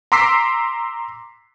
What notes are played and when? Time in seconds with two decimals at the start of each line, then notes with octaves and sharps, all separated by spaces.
0.12 A#5 C6 D6 E6 B6 C7